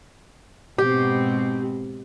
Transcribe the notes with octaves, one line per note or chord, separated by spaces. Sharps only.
G#2 B2 C4 G4